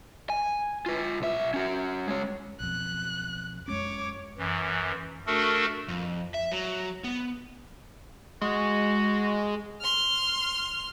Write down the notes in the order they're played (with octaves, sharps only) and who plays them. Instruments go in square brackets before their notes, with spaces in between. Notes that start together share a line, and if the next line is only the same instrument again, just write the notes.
[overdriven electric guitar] G#5
F4 B4
B1 E5
C#4 F#4
G#3 C#5
[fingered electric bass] B1 F2 [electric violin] F#6
[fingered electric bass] F#2 G#3 C#4 [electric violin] C#5 D6
[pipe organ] F#2 E3
A3 D4 F#4 A4 A#4
[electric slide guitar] F2
E5
F#3
B3
[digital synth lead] G#3 [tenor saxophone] F#4
[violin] C6 F6